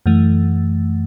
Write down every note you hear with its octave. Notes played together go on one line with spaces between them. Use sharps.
F#2 E3 A3